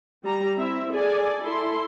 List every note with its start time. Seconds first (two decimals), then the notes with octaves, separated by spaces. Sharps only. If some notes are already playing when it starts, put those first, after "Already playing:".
0.24 G3 A#5
0.58 C4 E4 E5
0.92 G#4 A4 D5 G#5
1.42 E4 A4 C6